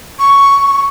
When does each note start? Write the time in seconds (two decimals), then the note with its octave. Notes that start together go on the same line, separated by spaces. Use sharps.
0.19 C#6